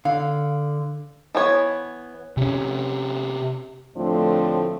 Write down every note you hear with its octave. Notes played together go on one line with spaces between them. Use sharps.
D3 F5
E3 B3 C#5
C3 C#4
D2 A2 F3 A3 C4 D4